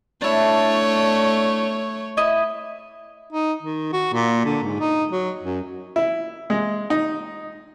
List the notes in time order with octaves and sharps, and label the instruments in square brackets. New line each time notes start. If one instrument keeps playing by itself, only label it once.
[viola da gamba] A3 C#5 [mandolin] D4 E4
[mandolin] E4 D#5
[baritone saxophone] D#4
D#3
F#4
A#2
D3
G#2
D#4
F#3
F#2
[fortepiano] E4
G#3
D#4